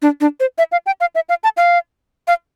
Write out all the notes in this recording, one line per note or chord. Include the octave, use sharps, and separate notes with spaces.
D4
D4
C5
E5
F5
G5
F5
E5
F5
A5
F5
F5